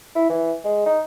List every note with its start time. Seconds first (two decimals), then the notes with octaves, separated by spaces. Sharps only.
0.16 E4
0.29 E3
0.65 G#3
0.86 D#4